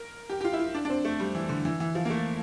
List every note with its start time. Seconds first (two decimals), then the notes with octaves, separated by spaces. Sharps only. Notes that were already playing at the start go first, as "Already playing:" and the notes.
Already playing: A#4
0.30 G4
0.41 G4
0.44 F4
0.53 E4
0.59 F4
0.75 D4
0.85 D4
0.90 C4
1.05 A3
1.20 G3
1.35 E3
1.49 D3
1.65 E3
1.80 E3
1.95 F3
2.05 A#3
2.10 A3